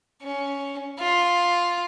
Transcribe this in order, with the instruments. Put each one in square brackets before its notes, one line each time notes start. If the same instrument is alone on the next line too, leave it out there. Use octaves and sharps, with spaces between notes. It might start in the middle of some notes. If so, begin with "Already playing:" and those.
[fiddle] C#4
F4